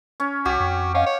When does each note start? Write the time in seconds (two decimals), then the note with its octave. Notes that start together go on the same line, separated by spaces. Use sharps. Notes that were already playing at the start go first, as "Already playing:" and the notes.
0.20 C#4
0.45 C2 F#4 G4
0.60 F2
0.94 C#4 D#5 F5 F#5
1.06 C#5